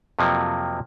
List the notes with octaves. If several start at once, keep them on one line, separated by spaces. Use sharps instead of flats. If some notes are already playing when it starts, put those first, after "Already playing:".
F2 C3 F3 F#3 A#3